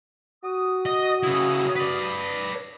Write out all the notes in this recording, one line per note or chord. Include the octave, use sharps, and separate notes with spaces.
F#4 D#6
D#5
C#3 E4
B4 D5